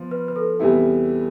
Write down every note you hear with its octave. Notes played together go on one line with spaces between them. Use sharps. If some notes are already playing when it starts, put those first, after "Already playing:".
Already playing: F3 B3
B4
B4
A4
E2 C3 G3 B3 E4